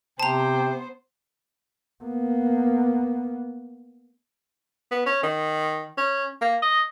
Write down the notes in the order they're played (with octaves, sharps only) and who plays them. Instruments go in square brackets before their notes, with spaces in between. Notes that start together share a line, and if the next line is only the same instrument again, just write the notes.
[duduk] C3 [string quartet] B3 C5 [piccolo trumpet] G5 [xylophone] A5 A#5
[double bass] A#3 B3
[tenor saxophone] B3
C#4
D#3
C#4
A#3
D#5